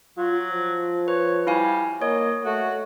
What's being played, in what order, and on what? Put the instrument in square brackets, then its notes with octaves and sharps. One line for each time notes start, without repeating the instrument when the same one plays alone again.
[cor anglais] F#3 [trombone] F4
[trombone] F3
[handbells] B4 [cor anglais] C#5
[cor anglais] G3 [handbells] E4 F5 G#5
[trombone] A#3 [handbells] C#5 [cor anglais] D#5
[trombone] A3 [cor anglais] F#4